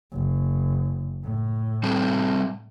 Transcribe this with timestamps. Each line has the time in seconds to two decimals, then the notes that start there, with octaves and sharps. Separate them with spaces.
0.13 F#1
1.24 A2
1.83 G3 C4 A4